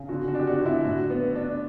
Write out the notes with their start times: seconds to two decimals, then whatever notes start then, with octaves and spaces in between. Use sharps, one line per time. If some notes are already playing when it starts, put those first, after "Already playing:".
Already playing: C#3
0.09 D3 F#4
0.28 F#4
0.34 D4 G4
0.47 F#4
0.60 D3
0.66 E4
0.85 A2 F#4
1.10 B3
1.35 D4